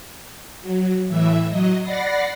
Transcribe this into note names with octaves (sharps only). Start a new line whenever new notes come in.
F#3
A2 E3 E5
F#3 D#5
D5 F#5 B5 A6 A#6 C7